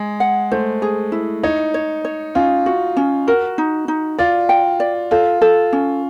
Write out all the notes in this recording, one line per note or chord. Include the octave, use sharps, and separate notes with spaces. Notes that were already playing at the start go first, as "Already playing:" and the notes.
Already playing: G#3
F#5
A3 C5
G#4
E4
D#4 C#5
C#5
C#5
C#4 F4
F#4
C#4
F#4 A#4
D#4
D#4
F4 D5
G5
D5
F4 A4
A4
C#4